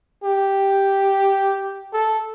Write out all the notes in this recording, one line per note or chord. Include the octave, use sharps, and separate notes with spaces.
G4
A4